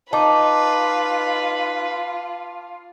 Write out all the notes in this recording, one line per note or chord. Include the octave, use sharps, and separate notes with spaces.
D#4 F4 B4 A5 D6